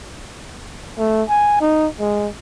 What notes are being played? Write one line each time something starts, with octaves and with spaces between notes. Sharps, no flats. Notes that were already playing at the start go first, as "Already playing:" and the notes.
A3
G#5
D#4
G#3